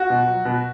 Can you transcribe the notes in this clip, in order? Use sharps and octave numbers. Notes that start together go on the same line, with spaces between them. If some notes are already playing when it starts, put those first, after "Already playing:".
Already playing: F#4
B2
F#3
B2